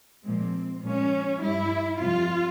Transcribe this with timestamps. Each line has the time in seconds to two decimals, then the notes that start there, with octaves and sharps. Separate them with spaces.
0.24 A#2 F3 G#3 C4
0.83 A#2 F3 G#3 C#4
1.42 G2 G3 E4
2.00 F2 C3 G3 F4